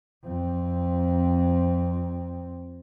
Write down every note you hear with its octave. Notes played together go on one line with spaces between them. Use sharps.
F2 C4